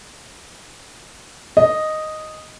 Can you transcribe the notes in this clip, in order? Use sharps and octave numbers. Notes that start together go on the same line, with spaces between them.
D#5